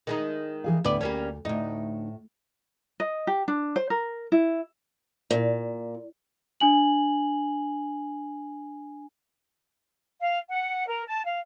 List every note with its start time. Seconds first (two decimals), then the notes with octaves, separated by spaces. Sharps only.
0.07 D#3 G#3 D#4
0.64 E3 G#4 F5
0.84 D2 A2 D3 B3 D5
1.01 D2 G3 A#3 C#4
1.45 D2 A2 D#4
3.00 D#5
3.27 G4
3.48 D4
3.76 C5
3.90 A#4
4.32 E4
5.30 A#2
6.60 D4 G#5 F#7
10.21 F5
10.49 F#5
10.88 A#4
11.07 A5
11.25 F5